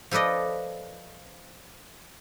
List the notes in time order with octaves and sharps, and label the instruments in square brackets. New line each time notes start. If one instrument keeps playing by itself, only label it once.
[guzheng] F3 A4 B4 D5 D#5